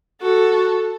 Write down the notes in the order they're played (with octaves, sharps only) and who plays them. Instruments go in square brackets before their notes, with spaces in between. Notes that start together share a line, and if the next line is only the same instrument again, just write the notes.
[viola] F#4 [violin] A4